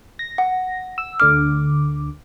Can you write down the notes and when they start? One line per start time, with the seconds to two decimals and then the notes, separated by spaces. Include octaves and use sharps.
0.19 A#6
0.38 F#5
0.98 E6
1.20 D2 D3 D6 F6